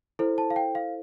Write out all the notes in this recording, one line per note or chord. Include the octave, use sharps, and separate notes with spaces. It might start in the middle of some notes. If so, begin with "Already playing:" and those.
E4 A4 C5
A5
F5
G5
F5